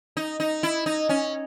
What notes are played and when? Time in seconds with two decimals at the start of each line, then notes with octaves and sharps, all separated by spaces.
0.17 D#4
0.40 D#4
0.63 E4
0.86 D#4
1.09 C#4